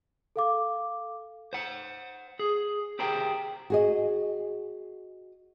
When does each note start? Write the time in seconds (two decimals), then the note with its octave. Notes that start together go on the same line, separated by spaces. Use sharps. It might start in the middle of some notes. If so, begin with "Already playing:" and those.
0.36 A4 F5 D6
1.53 C5 F#5
2.39 G#4
2.99 G4 G#4 A#4 C5 G5
3.70 F#4 G#4 D#5